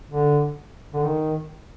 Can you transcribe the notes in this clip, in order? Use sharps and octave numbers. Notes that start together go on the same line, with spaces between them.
D3
D3
D#3